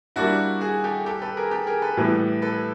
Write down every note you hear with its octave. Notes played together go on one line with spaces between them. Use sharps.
G3 A#3 D4 E4 F#4
F#4 G#4
G4 A4
G4 A4
A4 B4
G#4 A#4
G4 A4
G#4 A#4
A4 B4
A2 E3 G3 B3
A4 B4